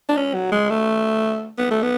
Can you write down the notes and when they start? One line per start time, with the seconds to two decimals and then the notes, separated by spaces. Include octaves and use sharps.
0.09 D4
0.17 C#4
0.34 F#3
0.52 G#3
0.70 A3
1.58 B3
1.71 A3
1.83 B3